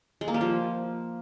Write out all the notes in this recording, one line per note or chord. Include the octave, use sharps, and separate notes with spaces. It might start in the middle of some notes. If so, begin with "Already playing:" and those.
G#3
A#3
G3
F3